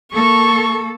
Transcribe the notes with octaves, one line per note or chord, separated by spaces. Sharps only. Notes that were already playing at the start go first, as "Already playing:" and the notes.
A#3 A4 C#6